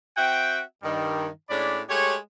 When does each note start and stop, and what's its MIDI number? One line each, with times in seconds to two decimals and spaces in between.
0.17 0.61 60
0.17 0.61 66
0.17 0.61 76
0.17 0.61 78
0.17 0.61 79
0.83 1.28 43
0.83 1.28 51
0.83 1.28 55
1.50 1.82 45
1.50 1.82 56
1.50 1.82 61
1.50 1.82 62
1.50 1.82 74
1.50 1.82 83
1.89 2.16 56
1.89 2.16 57
1.89 2.16 67
1.89 2.16 73